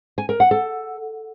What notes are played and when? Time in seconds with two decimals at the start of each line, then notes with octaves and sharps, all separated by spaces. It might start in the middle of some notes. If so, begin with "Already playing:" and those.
0.18 G#5
0.29 A#4
0.40 F#5
0.51 A4